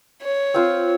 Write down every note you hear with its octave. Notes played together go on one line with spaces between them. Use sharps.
C#5
C4 F4 C5